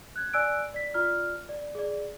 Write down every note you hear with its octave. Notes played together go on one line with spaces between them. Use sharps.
F#6 G#6
D5 G#5 E6 F#6 D7
D5 B6
F4 D5 F6
D5
G#4 D5